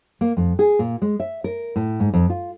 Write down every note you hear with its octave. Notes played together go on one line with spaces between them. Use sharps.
A#3
F2
G#4
A#2
G#3
E5
A#4
A2
G#2
F2
F4